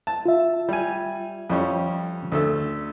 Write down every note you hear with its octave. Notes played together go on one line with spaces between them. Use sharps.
A5
F4 E5
G3 G#5
F2 G3 C#4
D2 A3 A4